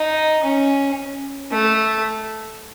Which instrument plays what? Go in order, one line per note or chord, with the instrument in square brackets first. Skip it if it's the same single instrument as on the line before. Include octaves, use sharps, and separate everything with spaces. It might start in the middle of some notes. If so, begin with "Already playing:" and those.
Already playing: [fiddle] D#4
C#4
A3